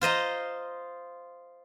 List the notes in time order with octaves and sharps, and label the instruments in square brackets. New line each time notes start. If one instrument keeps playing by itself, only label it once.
[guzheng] F4 C5 D#5 A#5